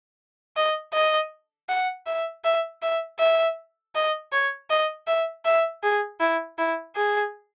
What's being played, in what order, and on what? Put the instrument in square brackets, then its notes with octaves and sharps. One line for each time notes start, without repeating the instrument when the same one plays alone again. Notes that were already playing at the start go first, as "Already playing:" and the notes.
[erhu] D#5
D#5
F#5
E5
E5
E5
E5
D#5
C#5
D#5
E5
E5
G#4
E4
E4
G#4